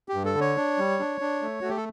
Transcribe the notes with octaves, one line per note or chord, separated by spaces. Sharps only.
G4
G2
A4
D3
C#5
D4
G3
D4
D4
A3
A3 F#4
G4
A4